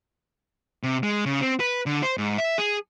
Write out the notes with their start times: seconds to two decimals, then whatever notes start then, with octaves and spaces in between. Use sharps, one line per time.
0.83 C3
1.03 G#3
1.26 C#3
1.41 C4
1.60 B4
1.86 D3
2.03 C5
2.18 G#2
2.38 E5
2.58 G#4